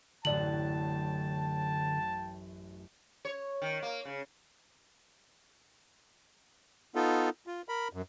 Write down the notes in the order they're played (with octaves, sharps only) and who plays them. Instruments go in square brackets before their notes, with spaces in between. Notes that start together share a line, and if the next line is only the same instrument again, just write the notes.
[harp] A1 F#2 [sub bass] D3 [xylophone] D5 F#7 [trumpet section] G5 A5
[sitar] C#5
D#3
A#3
C#3
[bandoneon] B3 D#4 F4 A4
F4
A#4 B5
F#2